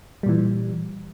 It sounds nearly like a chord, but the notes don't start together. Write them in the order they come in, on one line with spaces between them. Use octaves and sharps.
G3 A#2 E3